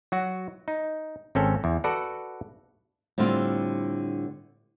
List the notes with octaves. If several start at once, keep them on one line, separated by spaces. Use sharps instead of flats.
F#3 F#4
D#4
G#1 C4 C#4 A4
E2
F#4 A4 B4 D5 F#5
A2 D3 G3 C4 F4